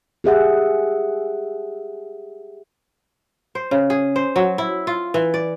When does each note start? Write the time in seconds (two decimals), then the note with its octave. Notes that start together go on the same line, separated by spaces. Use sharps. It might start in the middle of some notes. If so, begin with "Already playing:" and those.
0.24 G4 G#4 E5 F#5
3.55 C5
3.71 C#3
3.90 G#4
4.16 C5
4.36 F#3
4.58 E4
4.87 F4
5.14 E3
5.34 D5